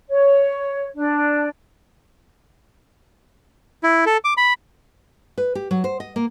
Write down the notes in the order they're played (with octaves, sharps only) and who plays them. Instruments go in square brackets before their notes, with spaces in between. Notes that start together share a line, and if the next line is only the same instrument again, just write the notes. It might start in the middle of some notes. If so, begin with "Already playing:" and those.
[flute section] C#5
D4
[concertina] E4
A4
D6
B5
[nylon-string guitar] B4
G4
F#3
C5
D#5
A#3